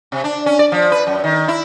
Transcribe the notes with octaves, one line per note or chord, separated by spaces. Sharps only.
C3
D4
C#4
D5
F3
B4
F#2
D#3
E4